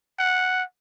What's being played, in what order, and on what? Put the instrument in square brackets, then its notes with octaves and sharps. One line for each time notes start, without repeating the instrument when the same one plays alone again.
[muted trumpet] F#5